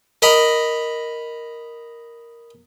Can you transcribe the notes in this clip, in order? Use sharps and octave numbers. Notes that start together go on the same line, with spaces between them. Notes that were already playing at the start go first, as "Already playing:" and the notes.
A#4 D#5 A#5 B5